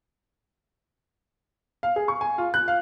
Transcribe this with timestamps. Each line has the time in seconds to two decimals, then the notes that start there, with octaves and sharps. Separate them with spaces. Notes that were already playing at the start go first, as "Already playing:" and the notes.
1.83 F5
1.96 G#4
2.08 C#6
2.21 G#5
2.38 F4
2.54 F#6
2.68 F5